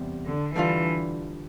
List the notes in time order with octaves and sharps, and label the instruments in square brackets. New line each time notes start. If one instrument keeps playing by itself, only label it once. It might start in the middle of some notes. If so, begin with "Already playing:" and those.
Already playing: [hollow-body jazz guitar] E2 C3 G3
[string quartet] D3
[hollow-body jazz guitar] D3 G3 D4 F4 [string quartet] E3